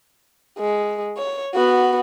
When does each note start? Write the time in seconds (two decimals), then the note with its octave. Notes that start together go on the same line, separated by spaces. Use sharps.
0.59 G#3
1.17 C#5
1.55 B3 F#4